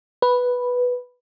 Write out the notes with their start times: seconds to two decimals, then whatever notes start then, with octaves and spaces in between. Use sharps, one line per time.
0.22 B4